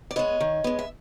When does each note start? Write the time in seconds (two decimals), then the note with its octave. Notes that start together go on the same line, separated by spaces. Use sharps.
0.11 D5
0.16 G#3 B3 C#5 D#5
0.40 D#3
0.64 G#3 B3
0.79 E5